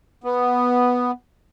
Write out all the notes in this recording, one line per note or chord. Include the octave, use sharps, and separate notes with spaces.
B3